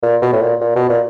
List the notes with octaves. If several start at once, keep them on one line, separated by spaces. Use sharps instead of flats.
A#2
B2
A2
A#2
A#2
B2
A#2